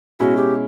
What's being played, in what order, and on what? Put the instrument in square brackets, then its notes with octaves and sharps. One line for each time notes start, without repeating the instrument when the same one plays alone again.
[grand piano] B2 G#3 C#4 E4 [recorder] F#4
[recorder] G4